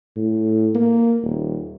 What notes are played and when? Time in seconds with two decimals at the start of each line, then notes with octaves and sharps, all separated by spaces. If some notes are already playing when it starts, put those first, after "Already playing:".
0.16 A2
0.75 A#3
1.23 D#1